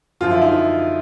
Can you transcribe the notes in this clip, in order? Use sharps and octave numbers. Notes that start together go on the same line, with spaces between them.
F#2 D3 F3 F4
E4
D#4
E4